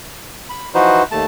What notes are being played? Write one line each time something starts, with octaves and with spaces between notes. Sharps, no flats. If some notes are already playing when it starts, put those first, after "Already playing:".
B5
E3 F3 D#4 F#4 B4 C5
D#2 A3 A5